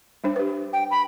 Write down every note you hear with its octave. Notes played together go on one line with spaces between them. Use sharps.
G3 D4 C5
G4 B4
G5
B5